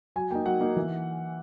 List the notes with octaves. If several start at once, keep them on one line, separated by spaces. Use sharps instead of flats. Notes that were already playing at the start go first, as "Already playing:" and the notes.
F#3 G#5
A#3 D#4 G5
F#3 F#5
A#3 D#4
E3